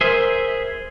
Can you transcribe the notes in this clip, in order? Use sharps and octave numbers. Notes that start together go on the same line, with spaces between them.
G#4 A#4 C5 E5